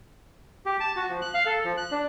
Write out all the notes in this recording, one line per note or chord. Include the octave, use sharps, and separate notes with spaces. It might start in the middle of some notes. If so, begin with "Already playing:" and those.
G4
A5
F#4
F3
F#6
F5
A4
F3
F#6
D4